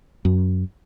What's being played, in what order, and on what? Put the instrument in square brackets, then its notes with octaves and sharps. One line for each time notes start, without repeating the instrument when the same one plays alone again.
[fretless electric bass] F#2